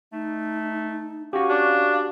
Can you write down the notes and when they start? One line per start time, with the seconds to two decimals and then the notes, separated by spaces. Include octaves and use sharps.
0.13 A3 D#4
1.33 C#4 F#4 G4 F5
1.49 D4